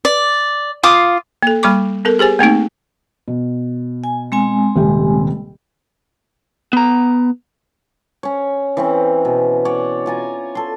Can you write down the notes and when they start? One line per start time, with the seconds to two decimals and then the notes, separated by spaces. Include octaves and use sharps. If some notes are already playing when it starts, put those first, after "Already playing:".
0.05 D5
0.83 F4 F5 D6 D#6
1.42 A#3 A4
1.63 G3 A#3 B5 C#6 D6
2.05 B3 A4 A#4
2.19 G4 G#4 C5 G#5
2.39 A3 A#3 C4 D#4
3.28 B2
4.04 G#5
4.32 G#3 C4 G#5
4.76 D#1 C3 G4
6.73 B3 A#5
8.23 C#4 C#5
8.77 E3 C4 C#4
9.25 B2
9.65 C#5 D5 F#5
10.06 F4 G#5 A#5
10.55 A4 C6